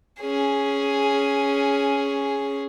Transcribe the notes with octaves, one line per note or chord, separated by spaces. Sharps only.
C#4 G#4